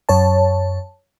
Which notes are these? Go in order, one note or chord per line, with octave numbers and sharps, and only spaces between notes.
F#2 C#5 A5